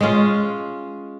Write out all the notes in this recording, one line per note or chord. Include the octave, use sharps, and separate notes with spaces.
G#3 C#4 F4